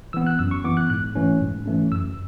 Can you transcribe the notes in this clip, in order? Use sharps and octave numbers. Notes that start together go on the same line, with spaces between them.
E3 B3 E6
F#6
F#2 E6
C#6
E3 B3 D6
F#6
G#2 F#6
E3 A3 C#4
G#2
E3 A3 C#4
F#2 E6